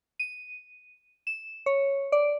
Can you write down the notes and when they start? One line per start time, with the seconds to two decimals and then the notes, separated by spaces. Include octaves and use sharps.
0.19 D#7
1.27 E7
1.66 C#5
2.12 D5